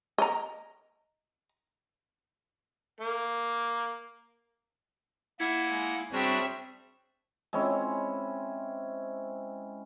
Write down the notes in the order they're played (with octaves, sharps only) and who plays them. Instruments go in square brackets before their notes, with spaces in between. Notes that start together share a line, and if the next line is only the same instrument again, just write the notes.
[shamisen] D#5 A#5
[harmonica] A#3
[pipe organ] A#3 F#5 G#6 [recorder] E4 [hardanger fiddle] E5
[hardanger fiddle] G#3
[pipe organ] G3 D4 F#4 [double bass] C4 [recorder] G#4 [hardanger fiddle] C#5 E5
[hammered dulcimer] G#3 C4 C#4 E4